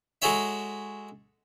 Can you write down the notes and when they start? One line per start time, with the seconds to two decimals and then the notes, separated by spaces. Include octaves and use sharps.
0.22 G#3 F#4 G#4 A4 C#5 E5